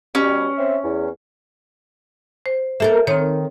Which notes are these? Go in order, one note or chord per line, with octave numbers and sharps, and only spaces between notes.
B2 G3 C#4
C4 C#5 E5
E2
C5
A#3 A4 A#4 E5
D#3 C4 C#5